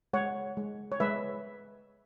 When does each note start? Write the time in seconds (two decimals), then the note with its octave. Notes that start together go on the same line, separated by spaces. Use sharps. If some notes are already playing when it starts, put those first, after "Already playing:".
0.13 G#3 C#5 F#5
0.57 G#3
0.92 C#5
1.00 G#3 B4 E5